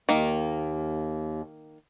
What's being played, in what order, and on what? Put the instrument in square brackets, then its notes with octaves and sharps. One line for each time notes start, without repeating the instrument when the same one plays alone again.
[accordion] D#2 [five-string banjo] D#3 A#3